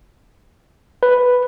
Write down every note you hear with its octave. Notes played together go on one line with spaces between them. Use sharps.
B4